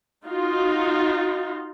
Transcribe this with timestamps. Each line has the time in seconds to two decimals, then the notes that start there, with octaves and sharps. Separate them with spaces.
0.25 D#4 F4 F#4